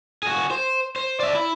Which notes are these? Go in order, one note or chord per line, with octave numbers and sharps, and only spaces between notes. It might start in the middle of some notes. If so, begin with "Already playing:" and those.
F#4 G#4
C5
C5
D5 E5
E4